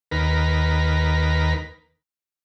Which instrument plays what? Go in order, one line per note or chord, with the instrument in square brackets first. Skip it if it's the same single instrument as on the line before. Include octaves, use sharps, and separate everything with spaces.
[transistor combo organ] D#2 A#4 B4